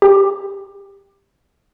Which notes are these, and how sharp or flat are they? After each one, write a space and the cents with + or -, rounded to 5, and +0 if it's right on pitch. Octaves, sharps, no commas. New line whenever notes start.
G4 +15